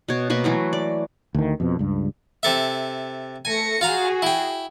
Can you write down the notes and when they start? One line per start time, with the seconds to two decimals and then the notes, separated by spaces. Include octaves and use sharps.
0.08 B2 C#5
0.30 B2 A#3 B4 C#6
0.44 E3 F#3 A3
0.73 D5
1.35 D2 D#3
1.60 F2 B2
1.79 C#2 G2
2.43 C3 A4 E5
3.45 A3 G#5 A#6 C#7
3.81 F4 F#4 G#4 F5 A#5
4.22 E4 G5